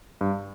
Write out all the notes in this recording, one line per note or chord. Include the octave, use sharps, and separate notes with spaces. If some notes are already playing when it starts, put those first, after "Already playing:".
G2